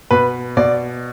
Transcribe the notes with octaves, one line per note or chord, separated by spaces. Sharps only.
B2 B4
B2 D5